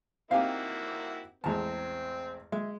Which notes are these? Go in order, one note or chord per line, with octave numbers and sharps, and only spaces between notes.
A#3 C4 D#4 E4 F#4 G4 F5 G#5
A1 E2 G#3 C4 A5 A#5
G#3 E5